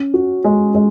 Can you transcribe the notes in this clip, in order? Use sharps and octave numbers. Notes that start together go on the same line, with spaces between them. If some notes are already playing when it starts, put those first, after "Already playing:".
Already playing: C#4
F#4
G#3
G#3